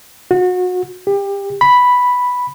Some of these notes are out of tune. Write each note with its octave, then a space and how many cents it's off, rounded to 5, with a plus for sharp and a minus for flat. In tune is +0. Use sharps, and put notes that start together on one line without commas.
F#4 -30
G4 +25
B5 +0